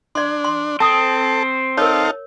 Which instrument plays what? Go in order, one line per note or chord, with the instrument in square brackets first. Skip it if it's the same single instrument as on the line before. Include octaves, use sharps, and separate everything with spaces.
[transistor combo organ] D4 [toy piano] D5 C6
[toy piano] C6
[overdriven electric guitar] C4 [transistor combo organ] A4 [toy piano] A5 D#6
[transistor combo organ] D#4 A4 F5 [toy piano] A#4 C#5